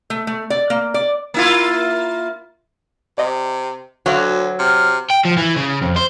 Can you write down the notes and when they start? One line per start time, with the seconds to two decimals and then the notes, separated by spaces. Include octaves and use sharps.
0.10 A3
0.27 A3
0.50 D5
0.70 A#3
0.94 D5
1.34 A#3 E4 F4
3.18 C3 D5 D#5
4.06 D2 F#3 C#5 F5 D6
4.59 C3 F6
5.11 G5
5.25 F3
5.37 E3
5.56 C#3
5.81 F2
5.96 C5